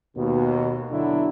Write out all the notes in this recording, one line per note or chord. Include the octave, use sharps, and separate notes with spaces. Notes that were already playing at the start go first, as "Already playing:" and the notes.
D#2 B2
B2 D3 F#3 D4 E4